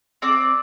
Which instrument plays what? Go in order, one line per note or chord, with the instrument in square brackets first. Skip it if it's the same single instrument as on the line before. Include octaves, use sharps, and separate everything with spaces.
[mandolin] C4 D5